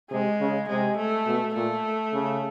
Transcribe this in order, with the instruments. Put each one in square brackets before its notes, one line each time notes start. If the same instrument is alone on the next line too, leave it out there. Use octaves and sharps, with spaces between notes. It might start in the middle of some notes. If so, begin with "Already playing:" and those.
[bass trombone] C3 [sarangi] G#3
[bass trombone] C#3
[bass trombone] C3 [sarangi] G#3
[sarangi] A3
[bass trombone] B2
[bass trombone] A#2 [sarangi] A3
[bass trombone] C#3